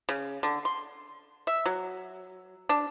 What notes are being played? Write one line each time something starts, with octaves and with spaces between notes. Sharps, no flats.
C#3
D3
C6
E5
F#3
D4